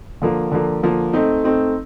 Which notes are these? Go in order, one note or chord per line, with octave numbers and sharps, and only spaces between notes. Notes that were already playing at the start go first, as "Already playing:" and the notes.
D3 F3 A#3
D3 F3 A#3
D3 F3 A#3
A3 C4 D#4
A3 C4 D#4